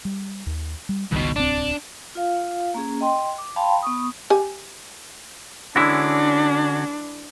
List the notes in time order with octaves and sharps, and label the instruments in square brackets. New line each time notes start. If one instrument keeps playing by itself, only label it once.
[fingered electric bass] G3
D#2
G3
[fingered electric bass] G1 C#2 D#3 [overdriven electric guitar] G2 B2
[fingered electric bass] D1 C2 C4 [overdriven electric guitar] D4
[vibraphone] F4 F5
A#3 C#4 G#4
D#5 G5 C6
D6
F5 G5 A5 B5 C6
B3 C#6 D#6
[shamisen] G4 G#5
[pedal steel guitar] D3 C#4 F#4 [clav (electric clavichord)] E3 G#3 E4 [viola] D4